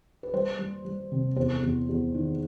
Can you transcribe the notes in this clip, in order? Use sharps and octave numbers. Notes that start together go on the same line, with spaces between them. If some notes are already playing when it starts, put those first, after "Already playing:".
B4
G3 C5
G3
G3
C3
E2 C5
E2
E2
D#3